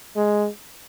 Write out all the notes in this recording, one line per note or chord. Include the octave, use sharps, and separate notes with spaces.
G#3